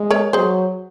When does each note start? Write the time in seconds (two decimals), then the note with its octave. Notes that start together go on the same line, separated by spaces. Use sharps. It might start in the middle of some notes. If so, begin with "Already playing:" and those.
Already playing: G#3
0.10 A#4 C#5
0.33 F#3 G#4 C5